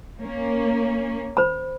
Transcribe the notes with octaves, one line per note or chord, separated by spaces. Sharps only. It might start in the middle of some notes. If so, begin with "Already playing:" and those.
A#3 C#4
C5 B5